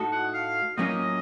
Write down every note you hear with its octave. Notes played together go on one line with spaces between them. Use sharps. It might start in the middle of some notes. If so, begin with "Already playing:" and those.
Already playing: A2 A3 D#4 F#4 A4
F#5
F5
A2 F#3 A#3 C#4 F4 D#5